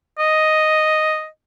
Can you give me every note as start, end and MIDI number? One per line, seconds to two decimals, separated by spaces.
0.19 1.27 75